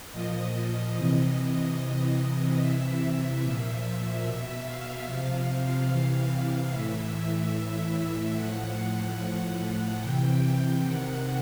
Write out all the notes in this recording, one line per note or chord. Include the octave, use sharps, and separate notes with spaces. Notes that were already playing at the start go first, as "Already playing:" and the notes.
A#2 F3 D#5
C3 E3 D#5
C3 E3
C3 E3 E5
A#2 F3
B2 E5
F5
C3 F3
C3 E3
A2 E3 E5
A2 E3
A2 F3 F#5
A2 F3
C3 E3 G5
G5
C3 D#3 F#5